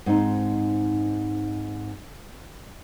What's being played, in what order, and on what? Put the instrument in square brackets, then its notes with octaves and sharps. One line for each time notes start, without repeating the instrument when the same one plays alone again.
[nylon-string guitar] G#2 C4 D#4